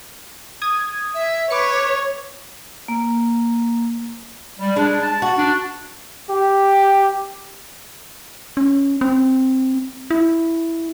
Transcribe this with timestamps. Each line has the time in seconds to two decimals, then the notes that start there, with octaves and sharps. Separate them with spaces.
0.62 D#6 G#6
1.14 E5
1.50 B4 C#5 D6 C#7
2.88 A#3
4.59 G3
4.76 G3 G#3 D4
5.02 A5
5.22 F#4
5.38 D4
6.30 G4
8.57 C#4
9.01 C4
10.10 E4